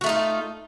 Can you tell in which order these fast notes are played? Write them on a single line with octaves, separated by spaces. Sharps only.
F#4 A3 D#4 F4